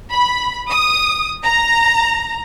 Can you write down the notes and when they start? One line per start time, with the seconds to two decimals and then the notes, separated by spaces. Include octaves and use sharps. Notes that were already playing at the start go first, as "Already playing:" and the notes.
0.11 B5
0.69 D#6
1.44 A#5